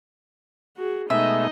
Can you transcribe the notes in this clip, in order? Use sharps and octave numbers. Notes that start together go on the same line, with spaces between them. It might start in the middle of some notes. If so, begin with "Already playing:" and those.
F#4 G#4
B2 G#3 A3 D#4 D#5 E5